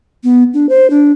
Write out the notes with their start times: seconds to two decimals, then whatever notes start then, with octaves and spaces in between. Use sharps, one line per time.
0.24 B3
0.54 D4
0.69 C5
0.90 D4